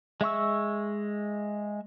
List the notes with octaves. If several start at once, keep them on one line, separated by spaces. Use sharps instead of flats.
G#3 E5 C#6 E6